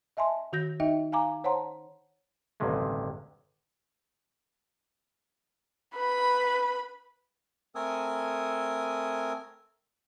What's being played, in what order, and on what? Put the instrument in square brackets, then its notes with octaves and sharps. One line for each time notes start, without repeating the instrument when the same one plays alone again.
[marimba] D#5 E5 G#5 A5 C6
D#3 F#4 G6 A#6
D#4 D#5 E5 G5
F5 G#5 A#5 D6
C5 C#5 F#5 A5 A#5 C6
[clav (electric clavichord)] A1 D2 G2 C3 D#3 G#3
[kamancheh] B4 B5
[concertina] A3 C4 A4 A#4 G#5 D#6